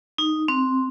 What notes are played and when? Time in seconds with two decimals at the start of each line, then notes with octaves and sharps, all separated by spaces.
0.18 D#4
0.48 C4